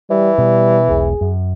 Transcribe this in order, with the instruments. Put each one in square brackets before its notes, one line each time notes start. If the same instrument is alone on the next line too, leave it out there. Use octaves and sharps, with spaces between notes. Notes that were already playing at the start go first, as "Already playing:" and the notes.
[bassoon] E3 [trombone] G3
[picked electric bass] B2 [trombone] G3
[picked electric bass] E1 B1 [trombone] G#4
[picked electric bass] F#2